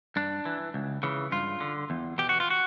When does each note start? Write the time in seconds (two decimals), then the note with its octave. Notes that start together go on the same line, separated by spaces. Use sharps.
0.16 G2 D4
0.45 E3
0.74 C#2
1.03 C#3 E3
1.32 G2 F4
1.60 D3
1.90 E2
2.18 B2 G4
2.29 F#4
2.40 F4
2.50 F#4